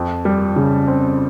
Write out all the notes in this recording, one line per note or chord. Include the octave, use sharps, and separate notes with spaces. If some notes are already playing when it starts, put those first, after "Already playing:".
Already playing: F2
G3
C#3
C4